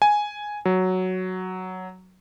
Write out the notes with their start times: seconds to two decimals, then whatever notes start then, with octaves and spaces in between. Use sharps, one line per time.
0.02 G#5
0.65 F#3